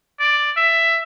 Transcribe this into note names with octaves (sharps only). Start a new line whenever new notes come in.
D5
E5